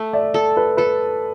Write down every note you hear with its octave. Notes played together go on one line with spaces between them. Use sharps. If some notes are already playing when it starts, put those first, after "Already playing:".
Already playing: A3
D5 E5
A4
B4
A4 B4